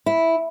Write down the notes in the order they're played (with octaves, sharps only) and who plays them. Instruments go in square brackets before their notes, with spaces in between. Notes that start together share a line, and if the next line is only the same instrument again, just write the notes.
[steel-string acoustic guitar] E4